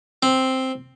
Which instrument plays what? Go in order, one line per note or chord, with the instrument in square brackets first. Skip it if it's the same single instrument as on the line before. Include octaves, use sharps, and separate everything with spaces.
[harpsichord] C4